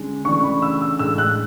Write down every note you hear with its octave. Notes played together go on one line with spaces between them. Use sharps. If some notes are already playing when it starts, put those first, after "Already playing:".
Already playing: D3 G#3 C#4
C#3 E3 A3 D4 C#6
C#6
B5
E6
E6
A2 G#3 D4 E6
F#6